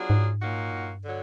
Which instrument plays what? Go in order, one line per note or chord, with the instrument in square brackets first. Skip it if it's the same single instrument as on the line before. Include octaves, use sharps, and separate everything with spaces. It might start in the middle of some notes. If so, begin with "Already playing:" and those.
Already playing: [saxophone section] F#3 B3 D4 F4 G#4
[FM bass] G#2
[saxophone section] A#2 F#3 A#3 D#4 F#4
[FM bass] G2
[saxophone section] D3 F#3